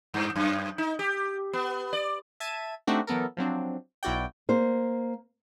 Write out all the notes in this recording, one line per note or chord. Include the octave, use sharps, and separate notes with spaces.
G2
F#2
D#4
G4
B3
D5
E5 A5 G#6 D#7
A3 C4 D4 D#4 F#4 G4
E3 F#3 B3 A4 A#4
F3 F#3 C4 D4
B1 E4 F#4 D5 G5
A#3 C5